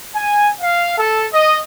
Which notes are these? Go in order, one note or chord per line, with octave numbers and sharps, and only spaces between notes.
G#5
F5
A4
D#5